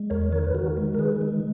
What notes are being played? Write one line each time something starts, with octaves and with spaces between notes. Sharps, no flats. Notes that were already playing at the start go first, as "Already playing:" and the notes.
Already playing: G#3
E2 A#4 C#5
D#3 A#4 C#5
B4
D#3 F#4 A#4
G#3
A#4
D#3 G#4 B4
G#3